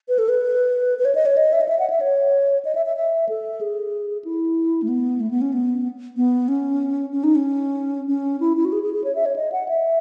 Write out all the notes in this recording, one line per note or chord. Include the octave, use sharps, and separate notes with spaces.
B4
A4
B4
B4
C#5
D#5
C#5
D#5
E5
D#5
E5
F#5
E5
C#5
D#5
E5
E5
E5
A4
G#4
E4
A3
B3
A3
B3
C#4
B3
B3
C#4
C#4
D#4
C#4
C#4
E4
E4
F#4
G#4
G#4
G#4
C#5
E5
C#5
D#5
F#5
E5